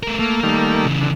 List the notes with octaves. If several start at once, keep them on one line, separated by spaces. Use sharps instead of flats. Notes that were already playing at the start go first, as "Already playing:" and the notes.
A3 A#4
A3 A#3
D#3 G3 A3
C#3 E3
D3